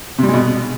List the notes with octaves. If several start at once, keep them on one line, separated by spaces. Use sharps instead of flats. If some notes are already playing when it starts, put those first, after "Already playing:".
C3
G3
G#3
B2